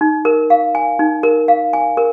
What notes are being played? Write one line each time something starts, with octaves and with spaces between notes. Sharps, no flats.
D#4
A#4
F5
G#5
D#4
A#4
F5
G#5
A#4